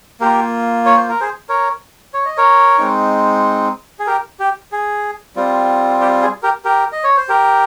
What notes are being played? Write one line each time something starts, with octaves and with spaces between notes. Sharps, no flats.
A#3 F4 G4 A#4
C#5
C5
A#4
G#4 C5
A#4 C#5
C#5
D#5
A#4 C#5
G#3 C4 D#4
G#4
G4 A#4
G4
G#4
G3 C4 F4
G4
G#4
G4 A#4
G4 A#4
D#5
C#5
C5
G4 A#4